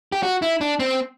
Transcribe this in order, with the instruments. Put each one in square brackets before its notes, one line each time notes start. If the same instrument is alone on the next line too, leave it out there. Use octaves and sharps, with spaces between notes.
[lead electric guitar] G4
F#4
E4
D4
C4